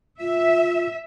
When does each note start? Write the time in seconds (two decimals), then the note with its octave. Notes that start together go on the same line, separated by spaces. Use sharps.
0.20 F4 E5